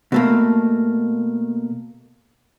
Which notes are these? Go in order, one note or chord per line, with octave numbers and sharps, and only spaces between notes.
B2 A3 A#3